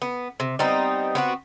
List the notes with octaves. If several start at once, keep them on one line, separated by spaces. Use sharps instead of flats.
B3
C3
G3 B3 C4 D#4
B3 C4 F#4